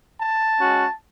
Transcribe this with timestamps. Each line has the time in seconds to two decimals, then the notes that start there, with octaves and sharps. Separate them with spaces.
0.19 A5
0.58 G#3 C#4 F#4